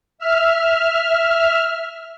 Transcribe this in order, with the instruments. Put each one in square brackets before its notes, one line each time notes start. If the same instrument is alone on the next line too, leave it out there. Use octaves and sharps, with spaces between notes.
[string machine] E5 F6